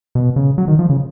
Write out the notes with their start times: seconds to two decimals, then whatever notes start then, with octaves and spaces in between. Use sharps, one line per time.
0.15 B2
0.36 C#3
0.58 F#3
0.68 D#3
0.79 F3
0.90 C#3